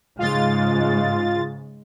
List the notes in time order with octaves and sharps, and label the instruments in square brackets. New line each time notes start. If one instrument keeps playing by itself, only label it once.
[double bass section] G#2 C#3 G#3 [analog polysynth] F4 A6